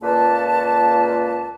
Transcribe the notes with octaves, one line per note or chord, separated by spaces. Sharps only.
C#2 A#2 A#3 B4 A5